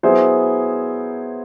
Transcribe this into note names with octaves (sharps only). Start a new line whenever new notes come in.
F#3 B3 E4 G#4 C5